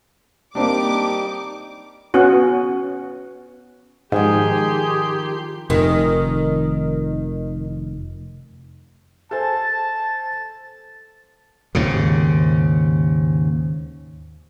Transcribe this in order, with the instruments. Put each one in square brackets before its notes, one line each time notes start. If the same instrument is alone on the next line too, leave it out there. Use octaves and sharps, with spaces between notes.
[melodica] G3 D#4 G4 [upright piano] A#3 C4 D4 [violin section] D6
[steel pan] B3 C#4 F#4
[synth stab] G#2 [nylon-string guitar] D#3 F3 [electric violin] G4 C6 [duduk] G#4
[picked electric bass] F1 [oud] D#3
[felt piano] A4 C5 G#5 [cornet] A5 [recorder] A6
[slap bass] D#2 G#2 C#3